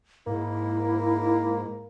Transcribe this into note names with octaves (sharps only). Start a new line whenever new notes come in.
G#2 A#3 E4